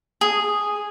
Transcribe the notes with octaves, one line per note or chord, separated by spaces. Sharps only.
G#4